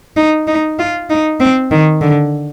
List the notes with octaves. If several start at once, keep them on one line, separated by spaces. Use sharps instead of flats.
D#4
D#4
F4
D#4
C4
D#3
D3